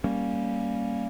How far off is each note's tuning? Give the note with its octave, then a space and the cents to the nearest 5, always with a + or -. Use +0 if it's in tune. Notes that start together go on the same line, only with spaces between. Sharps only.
G3 +0 A#3 +0 C#4 +0